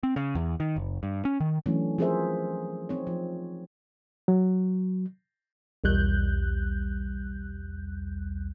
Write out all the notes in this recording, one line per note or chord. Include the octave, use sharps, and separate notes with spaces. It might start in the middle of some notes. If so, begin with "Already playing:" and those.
C4
C#3
E2
D#3
F#1
G2
C#4
D#3
E3 F#3 A3 C#4 D4
F3 C4 G#4 A#4 C5 E5
C4 D#4 C#5
F3
F#3
B1 E2 G3 F#6 G6